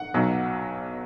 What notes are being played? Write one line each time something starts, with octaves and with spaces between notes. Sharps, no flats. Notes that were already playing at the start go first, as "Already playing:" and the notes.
Already playing: F#5
B1 B2 F#3